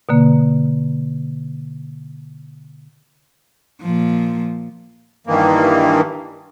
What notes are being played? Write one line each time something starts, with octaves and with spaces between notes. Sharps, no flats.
B2 D3 A#3
A#2 F3
G2 D#3 E3 A#3